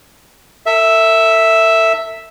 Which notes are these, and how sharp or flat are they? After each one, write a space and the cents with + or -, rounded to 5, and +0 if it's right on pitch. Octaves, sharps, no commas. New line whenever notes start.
A4 +40 E5 +0